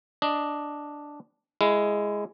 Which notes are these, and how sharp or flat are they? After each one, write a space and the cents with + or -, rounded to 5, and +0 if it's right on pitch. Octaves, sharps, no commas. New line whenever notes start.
D4 +0 D#5 +0
G#3 +0 E4 +20